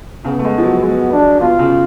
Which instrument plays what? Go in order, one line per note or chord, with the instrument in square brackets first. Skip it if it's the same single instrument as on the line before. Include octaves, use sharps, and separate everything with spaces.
[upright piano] C#3 [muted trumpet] B3
[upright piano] A3
G#3
F3
F#3
[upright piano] G#3 [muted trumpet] B3
[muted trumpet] D4
[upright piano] B2 [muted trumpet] F4
[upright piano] C#3